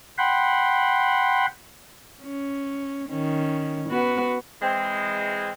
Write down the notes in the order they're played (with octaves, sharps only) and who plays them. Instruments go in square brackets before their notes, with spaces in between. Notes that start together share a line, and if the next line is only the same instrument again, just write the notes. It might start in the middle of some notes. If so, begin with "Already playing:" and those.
[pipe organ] F#5 G5 B5 C6
[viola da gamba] C#4
D#3 C#4
B3 F#4 B4
[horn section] E3 G#3 C4